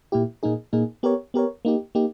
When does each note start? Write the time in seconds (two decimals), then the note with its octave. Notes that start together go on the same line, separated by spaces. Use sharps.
0.12 A#2 A#3 E4 G4
0.43 A#2 A#3 D#4 G#4
0.73 A#2 A#3 D#4 G#4
1.03 B3 G4 A#4 C#5
1.34 B3 G4 A#4 C#5
1.65 A#3 D#4 G4
1.95 A#3 D#4 G4